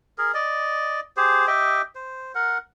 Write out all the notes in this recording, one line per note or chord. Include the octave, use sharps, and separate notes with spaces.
G#4 A#4
D5 D#5
G4 G#4 C5
G4 D#5 E5 G5
C5
A#4 F#5